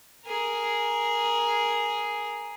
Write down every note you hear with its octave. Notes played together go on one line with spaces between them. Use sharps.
G#4 A#4